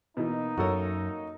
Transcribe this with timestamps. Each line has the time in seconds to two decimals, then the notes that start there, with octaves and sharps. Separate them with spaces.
0.17 B2 E3 A#3 D#4
0.57 F#2 F#4 A4 A#4 C#5